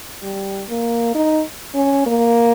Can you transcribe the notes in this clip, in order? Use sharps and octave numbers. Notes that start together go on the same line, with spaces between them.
G3
A#3
D#4
C#4
A#3